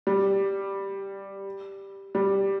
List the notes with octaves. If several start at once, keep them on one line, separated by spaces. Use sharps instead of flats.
G3
G3